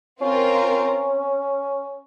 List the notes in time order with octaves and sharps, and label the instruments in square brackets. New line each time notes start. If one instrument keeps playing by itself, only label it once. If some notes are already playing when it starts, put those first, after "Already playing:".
[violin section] C4 F4 A#4 [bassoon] C#4